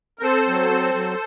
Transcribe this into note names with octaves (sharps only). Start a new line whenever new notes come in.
A#4
C4 A4 C5
F#3
C4
F#3